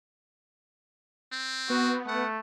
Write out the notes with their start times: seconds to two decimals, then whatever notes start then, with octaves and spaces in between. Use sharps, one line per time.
1.32 C4
1.70 B3 F#4
2.07 A3 F#5